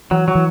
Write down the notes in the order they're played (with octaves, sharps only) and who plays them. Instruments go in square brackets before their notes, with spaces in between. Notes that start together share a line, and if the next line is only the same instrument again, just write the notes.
[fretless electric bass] E3 [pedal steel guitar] F#3
[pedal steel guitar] F#3
[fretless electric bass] E3